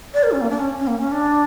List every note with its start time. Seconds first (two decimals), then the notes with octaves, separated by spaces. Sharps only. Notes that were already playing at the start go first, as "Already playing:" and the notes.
0.14 D5
0.23 A#4
0.32 C#4
0.41 A#3
0.50 D4
0.59 C#4
0.79 C#4
0.87 A#3
0.99 C#4
1.12 D4